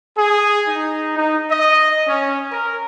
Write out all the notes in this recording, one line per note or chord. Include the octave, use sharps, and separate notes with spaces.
G#4
D#4
D#4
D#5
C#4
A#4